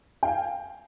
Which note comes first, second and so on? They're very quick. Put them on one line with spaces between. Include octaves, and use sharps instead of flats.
G5 F5 G#5